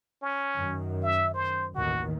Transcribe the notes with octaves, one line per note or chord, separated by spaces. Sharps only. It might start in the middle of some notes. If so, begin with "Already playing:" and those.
C#4
F#2 D#3
E5
C5
A1 D#2 D#3 F#4